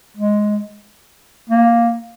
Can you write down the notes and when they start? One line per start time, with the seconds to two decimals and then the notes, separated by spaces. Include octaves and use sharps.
0.17 G#3
1.49 A#3